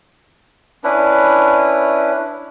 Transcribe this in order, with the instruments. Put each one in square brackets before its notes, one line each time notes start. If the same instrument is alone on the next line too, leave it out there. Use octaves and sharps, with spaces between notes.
[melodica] C#4 D4 E4 B4